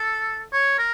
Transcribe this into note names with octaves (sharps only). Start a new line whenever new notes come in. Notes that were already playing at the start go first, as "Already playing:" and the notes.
Already playing: A4
C#5
A#4